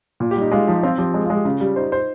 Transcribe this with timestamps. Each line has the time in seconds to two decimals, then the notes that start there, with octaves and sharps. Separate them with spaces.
0.20 A#2
0.31 G4
0.36 G3
0.41 D#4
0.51 G#3 F4
0.68 F3 D#4
0.83 C4 F4
0.98 F3 G4
1.14 G#3
1.25 F4
1.30 G#3
1.35 G4
1.45 C#3 F4
1.61 G3
1.76 D#4 C5
1.92 C5